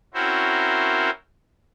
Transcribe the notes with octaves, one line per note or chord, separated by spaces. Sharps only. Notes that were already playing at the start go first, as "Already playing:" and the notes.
C4 C#4 E4 F#4 A#4 C5